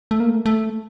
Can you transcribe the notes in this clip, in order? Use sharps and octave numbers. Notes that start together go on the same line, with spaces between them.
A3
A#3
A3
A3